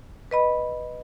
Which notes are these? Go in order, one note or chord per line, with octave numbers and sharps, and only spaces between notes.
B4 D#5 B5